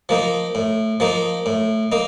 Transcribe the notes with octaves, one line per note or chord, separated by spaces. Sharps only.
F3 A#3 D#4
A2
F3 A#3 D#4
A2
A#3 D#4